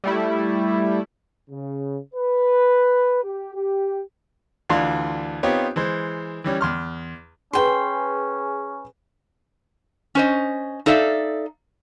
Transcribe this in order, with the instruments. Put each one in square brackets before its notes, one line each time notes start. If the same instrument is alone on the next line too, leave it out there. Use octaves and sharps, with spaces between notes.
[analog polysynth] G3 A3 E4
[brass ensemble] C#3
B4
G4
G4
[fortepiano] D2 E3 D4 F4 F5 C6
B3 C4 D#4 F4 G4 C#5
E3 G#3 C5
E3 G3 C#4
E2 C6 F6
[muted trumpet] C#4 [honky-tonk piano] G#4 B4 [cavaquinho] G5 C6
[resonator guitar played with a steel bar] C#4 C5 D#5
D#4 A4 D5 E5 F5